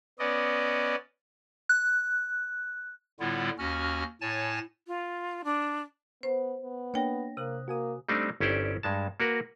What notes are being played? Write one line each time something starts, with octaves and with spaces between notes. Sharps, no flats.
B3 C#4 D5 D#5
F#6
A2 D3 G3 B3 E4 F4
D#2 C#4 F#4 F6
A2 C#5 G#5 A5 A6
F4
D4
B3 C5
B3
A#3 D4 C#5 G5 A#6
C3 A#3 D#6 F#6
A#3 F#4 G#5 D#6
G3 A3 C4 D4 D#4
G1 C#4 E4 G4 C5 D5
G2 G#3 A5
A#3 F#4 A#4 B4